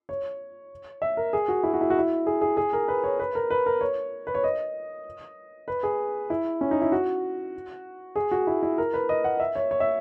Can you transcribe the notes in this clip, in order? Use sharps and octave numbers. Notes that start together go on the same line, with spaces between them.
C#5
E5
A#4
G#4
F#4
E4
F#4
E4
F#4
E4
G#4
G#4
G#4
A#4
B4
C#5
B4
A#4
B4
A#4
C#5
B4
C#5
D#5
B4
G#4
E4
C#4
D#4
E4
F#4
G#4
F#4
E4
E4
A#4
B4
D#5
F#5
E5
C#5
C#5
E5